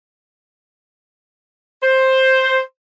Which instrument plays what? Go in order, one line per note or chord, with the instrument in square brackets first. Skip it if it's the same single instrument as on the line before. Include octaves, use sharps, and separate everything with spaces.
[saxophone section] C5